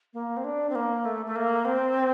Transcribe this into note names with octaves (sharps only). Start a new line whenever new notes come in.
A#3
C4
D4
C4
A#3
A3
A3
A#3
C4